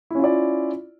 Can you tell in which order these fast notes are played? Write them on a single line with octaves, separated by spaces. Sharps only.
E4 C#4 F4 D5